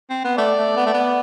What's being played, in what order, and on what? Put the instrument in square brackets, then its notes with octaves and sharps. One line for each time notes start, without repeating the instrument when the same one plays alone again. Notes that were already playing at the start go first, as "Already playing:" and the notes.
[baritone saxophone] C4
B3
[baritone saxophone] A3 [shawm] D5
[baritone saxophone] A3
B3
A3
B3